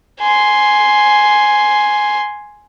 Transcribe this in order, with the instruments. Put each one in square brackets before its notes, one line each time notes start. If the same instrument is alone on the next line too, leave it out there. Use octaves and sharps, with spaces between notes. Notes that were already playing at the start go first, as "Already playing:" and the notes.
[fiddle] G#5 C6